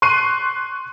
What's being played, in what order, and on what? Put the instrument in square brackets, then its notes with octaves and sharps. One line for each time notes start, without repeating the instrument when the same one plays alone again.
[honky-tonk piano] C6 C#6 F#6 C7 D#7